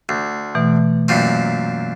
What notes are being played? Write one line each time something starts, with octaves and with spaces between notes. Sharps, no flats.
D2
B2 E3 A3
F#2 A#2 C4